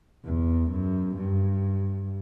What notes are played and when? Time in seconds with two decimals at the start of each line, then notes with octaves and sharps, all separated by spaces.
0.25 E2
0.71 F#2
1.17 G2